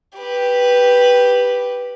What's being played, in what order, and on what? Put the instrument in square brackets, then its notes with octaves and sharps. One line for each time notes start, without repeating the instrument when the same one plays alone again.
[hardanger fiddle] G4 B4